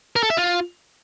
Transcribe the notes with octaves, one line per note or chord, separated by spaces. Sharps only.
A#4
A4
E5
F4